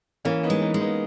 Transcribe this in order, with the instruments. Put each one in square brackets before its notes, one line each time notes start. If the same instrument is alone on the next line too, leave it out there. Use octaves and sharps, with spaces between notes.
[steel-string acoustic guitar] E3 [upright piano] A#3 C#4
[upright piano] B3 D#4
[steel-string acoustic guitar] G#3
[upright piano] B3 D#4
[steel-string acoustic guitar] G#3
[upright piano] B3 D#4